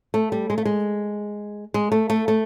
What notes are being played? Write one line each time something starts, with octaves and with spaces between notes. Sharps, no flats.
A3
G3
G#3
A3
G#3
G#3
A3
A3
A3